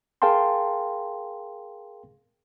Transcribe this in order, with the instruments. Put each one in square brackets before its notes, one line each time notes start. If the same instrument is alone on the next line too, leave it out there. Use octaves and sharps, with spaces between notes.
[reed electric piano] G#4 A#4 F5 G5 A5 C6